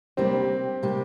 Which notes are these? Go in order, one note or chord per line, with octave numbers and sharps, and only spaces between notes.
C3 G3 A#3 C4 D4 G4
C3 G3 A#3 D4 G4